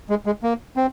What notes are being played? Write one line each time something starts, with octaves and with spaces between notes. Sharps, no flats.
G#3
G#3
A#3
C4